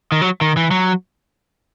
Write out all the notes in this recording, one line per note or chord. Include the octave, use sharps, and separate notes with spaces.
D#3
F#3
D#3
E3
F#3